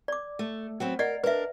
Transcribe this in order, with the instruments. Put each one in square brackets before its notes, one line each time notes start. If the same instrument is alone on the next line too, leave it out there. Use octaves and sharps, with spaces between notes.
[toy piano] D5 D6
[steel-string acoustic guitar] A3
F#3 B3 C4
[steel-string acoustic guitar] A#4 [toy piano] D5 D#5 F#5
[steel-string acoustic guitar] D4 A#4 [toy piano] B4 E5